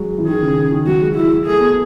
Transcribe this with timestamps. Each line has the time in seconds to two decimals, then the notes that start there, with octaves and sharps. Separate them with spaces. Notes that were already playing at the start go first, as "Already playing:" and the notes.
Already playing: F#3 G#3
0.18 E3
0.27 D#3 G#4
0.41 C#3
0.57 C#3
0.72 D#3
0.87 F#3 F#4
1.01 G#3
1.16 G#3 E4
1.46 A3 G#4
1.59 B3